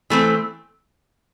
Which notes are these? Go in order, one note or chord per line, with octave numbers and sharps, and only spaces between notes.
E3 A3 C4